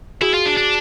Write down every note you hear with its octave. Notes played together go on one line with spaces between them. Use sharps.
E4 F#4 G#4
F4
D4
D4